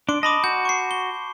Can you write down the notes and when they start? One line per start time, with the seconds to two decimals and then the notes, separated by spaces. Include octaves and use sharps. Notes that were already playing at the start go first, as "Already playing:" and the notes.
0.09 D4 C6 D7
0.23 D#5 A5 B5 D6
0.44 F#4 G6
0.65 C#6 C7
0.91 G7